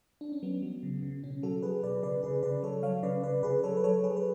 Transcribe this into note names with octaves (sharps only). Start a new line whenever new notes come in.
D4
C#4
F#3 B3
F#3
C#3
C#3
B2 C#4
F#3 F#4 A4
F#3 G#4 B4
B2 B4 D5
C#3 B4 D5
C#3 G#4 B4
C#3 B4 D5
F#3 A4 C#5
F#3 C#5 F5
C#3 B4 D5
C#3 B4 D5
C#3 G#4 B4
F#3 A4 C#5
B4
F#3 A4 C#5
F#3 G#4 B4
B4